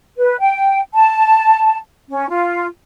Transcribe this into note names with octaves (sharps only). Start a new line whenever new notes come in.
B4
G5
A5
C#4
F4